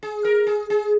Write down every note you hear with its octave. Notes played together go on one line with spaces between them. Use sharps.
G#4
A#4
G#4
G#4